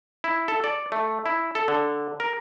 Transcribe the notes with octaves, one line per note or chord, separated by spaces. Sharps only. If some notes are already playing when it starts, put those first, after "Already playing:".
E4
A4
D5
A3
E4
A4
D3
A#4